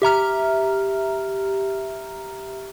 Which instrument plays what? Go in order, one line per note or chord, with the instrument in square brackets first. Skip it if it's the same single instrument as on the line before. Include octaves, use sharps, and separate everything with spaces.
[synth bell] G4 E5 A#5 F6